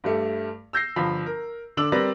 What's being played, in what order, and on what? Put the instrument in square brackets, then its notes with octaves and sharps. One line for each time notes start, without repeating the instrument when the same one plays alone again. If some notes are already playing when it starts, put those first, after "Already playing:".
[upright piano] G2 G3 A3
E6 G6 A#6 C7
G1 F3 B5
A#4
D3 D4 D6 E6 F#7
G3 C4 A#4 B4 D5 A#6